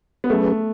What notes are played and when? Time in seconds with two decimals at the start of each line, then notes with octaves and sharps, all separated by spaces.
0.24 B3
0.30 F#3 A3 C#4 G#4 B4